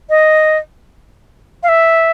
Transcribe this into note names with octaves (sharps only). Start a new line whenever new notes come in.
D#5
F5
E5